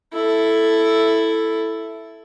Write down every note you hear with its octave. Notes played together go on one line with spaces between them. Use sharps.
E4 A4